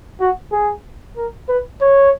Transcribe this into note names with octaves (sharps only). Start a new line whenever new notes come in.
F#4
G#4
A#4
B4
C#5